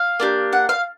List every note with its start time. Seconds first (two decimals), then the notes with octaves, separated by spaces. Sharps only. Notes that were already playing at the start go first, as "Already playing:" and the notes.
Already playing: F5
0.20 A#3 D4 G4
0.53 F#5
0.69 F5